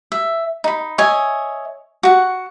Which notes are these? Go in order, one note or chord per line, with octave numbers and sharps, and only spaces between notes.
E5
D#4 B5
C#5 D#5 E5 G#5
F#4 F#5